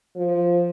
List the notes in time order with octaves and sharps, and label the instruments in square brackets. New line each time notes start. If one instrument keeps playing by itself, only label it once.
[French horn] F3